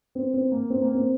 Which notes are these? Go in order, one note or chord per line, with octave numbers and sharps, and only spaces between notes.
C4
C4
A#3
C4
A#3
C4